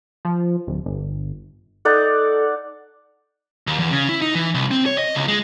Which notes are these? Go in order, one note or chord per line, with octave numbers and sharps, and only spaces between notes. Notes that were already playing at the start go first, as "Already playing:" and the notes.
F3
D1
G1
D#4 A4 D5 F#5
D#2
E2
C#3
E4
D#4
E3
C2
C4
C#5
D#5
C#2
G#3